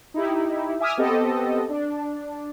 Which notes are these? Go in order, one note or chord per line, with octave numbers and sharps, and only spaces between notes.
D#4 E4 G4
E5 G#5 D6 D#6 F6
B3 C4 G4 A4 D#5
D4